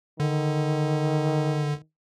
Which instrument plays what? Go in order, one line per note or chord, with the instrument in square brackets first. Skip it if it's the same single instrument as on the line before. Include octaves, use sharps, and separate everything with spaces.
[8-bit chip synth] D3 [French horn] D#3